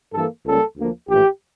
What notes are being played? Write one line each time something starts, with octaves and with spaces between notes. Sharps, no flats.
G2 E3 A#3 A4
C#2 C#3 G3 A#3 A4
D2 D3 F3 A#3
A#1 A2 E3 G4